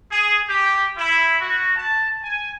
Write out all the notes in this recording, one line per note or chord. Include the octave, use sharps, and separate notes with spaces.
G#4
G4
E4
F#4
A5
G#5